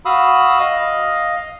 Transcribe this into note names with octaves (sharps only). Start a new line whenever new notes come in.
F#4 F5 B5 D#6 E6
D#5 F5